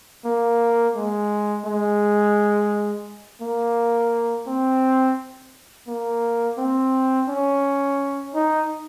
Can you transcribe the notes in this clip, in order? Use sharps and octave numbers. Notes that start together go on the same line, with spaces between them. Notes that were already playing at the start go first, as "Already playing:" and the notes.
A#3
G#3
G#3
A#3
C4
A#3
C4
C#4
D#4